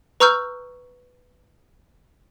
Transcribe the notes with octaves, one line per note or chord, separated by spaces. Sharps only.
B4 A#5 C#6 E6 F6 G6